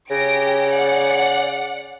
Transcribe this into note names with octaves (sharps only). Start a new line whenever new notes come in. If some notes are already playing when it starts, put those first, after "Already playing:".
C#3 G4 A#6 D7
D5 F#5